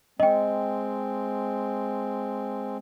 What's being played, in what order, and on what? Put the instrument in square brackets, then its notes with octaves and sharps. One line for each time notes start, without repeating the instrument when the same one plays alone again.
[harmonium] G#3 C4 [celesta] D#5 G5